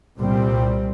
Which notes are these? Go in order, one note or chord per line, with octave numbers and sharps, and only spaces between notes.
C2 A#2 G3 C4